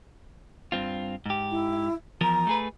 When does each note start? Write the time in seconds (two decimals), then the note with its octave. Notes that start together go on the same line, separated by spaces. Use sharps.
0.72 G2 C4 F4
1.26 G#2 G4
1.50 E4
2.21 E2 F3 A#4 A#5
2.47 A3 G#4 B4